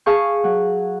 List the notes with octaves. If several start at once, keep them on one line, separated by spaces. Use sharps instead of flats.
G#4 F5 A5 C#6 G6
F#3